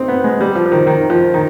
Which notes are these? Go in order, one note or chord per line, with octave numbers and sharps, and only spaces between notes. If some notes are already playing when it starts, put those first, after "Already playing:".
Already playing: C4 D#4
B3
G#3
G3
F3
F3
D#3
D#3
F3
D#3